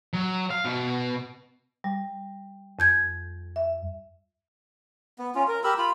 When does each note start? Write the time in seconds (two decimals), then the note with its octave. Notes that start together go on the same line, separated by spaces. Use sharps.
0.13 F#3
0.51 F5
0.65 B2
1.84 G3
2.79 F2 G6 G#6
3.56 E5
5.19 B3
5.35 C#4 F4
5.48 A#4
5.64 G4 A#4 B5 E6
5.78 F4 B5